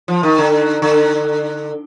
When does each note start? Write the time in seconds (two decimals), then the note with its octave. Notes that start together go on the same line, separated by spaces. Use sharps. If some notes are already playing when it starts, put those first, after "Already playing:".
0.08 F3
0.23 D#3
0.38 D3
0.82 D3